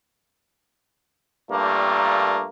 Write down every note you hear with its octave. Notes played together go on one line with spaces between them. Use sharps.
G2 A#2 G3 A3 A#3